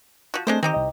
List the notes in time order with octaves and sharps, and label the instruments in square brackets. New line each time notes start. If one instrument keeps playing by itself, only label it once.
[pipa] F3 F#4
[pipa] G#3 D4 C5 [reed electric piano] A3 C4
[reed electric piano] D#3 [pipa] C4 D#4 G4
[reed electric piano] C2 D#5